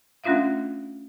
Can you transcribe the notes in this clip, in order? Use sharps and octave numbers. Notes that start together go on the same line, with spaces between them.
A3 C#4 D4 F4 E5 F5